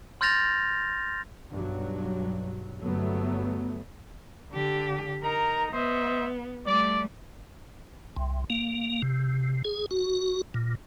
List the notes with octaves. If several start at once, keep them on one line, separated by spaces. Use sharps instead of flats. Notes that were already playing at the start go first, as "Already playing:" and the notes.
C6 F6 G6 A6 A#6 F7
B1 G2 F#3
G1 F#3 A3 B3
D3 G4
D#4 A#4 A#5
B3 C5 D#5 E5
G3 A3 D5
C2
A#3
C3
G#4
F#4
A#2